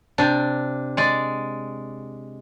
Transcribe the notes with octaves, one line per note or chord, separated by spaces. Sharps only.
C3 D4
G#3 D5